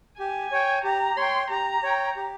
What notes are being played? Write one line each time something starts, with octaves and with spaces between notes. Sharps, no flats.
G4 G#5
C#5 G5
G4 A#5
C#5 G5 C6
G4 A#5
C#5 G5
G4